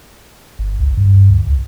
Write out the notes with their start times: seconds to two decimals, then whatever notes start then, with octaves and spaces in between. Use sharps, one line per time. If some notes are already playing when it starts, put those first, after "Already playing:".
0.59 G1
0.80 C#2
0.97 G2
1.30 D2
1.47 C#2